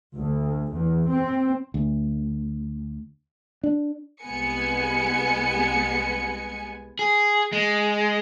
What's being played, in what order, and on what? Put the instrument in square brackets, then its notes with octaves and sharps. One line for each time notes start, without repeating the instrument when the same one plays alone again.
[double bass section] D2
E2
C4
[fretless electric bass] D2
D4
[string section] C2 G#3 B3 G#5 C#7
[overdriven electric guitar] G#4
G#3